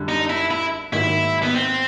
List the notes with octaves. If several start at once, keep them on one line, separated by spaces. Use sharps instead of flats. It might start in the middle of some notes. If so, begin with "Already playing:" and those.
Already playing: F#2 D3 G3
D#4
E4
E4
G#2 D#3 F#3 A#3 E4
B3
C4